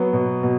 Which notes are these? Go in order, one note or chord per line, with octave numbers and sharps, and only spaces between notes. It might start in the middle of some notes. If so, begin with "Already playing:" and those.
Already playing: F#3 B3
B2
B2